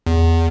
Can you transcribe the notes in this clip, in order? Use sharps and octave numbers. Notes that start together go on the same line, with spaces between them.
E2